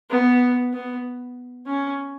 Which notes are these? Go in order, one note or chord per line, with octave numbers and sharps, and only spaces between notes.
B3
B3
C#4